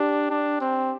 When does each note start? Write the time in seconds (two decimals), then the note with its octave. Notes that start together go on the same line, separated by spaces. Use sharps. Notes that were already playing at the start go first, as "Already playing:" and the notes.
Already playing: D4 G4
0.30 D4
0.61 C4